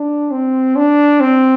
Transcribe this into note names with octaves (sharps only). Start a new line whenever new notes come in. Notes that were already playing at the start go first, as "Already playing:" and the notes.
Already playing: D4
C4
D4
C4